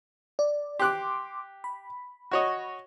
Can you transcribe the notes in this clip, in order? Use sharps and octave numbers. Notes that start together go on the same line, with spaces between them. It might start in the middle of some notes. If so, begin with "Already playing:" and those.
D5
G4 C6 D6 F#6
B5
F#4 C#5 D#5